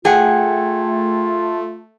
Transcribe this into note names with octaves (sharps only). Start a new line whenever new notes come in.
A3 F4 G#4 F#5 G5